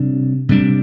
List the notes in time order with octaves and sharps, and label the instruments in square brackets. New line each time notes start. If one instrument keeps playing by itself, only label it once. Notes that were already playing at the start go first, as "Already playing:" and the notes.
Already playing: [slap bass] C3 G3 D4
C3 G3 D4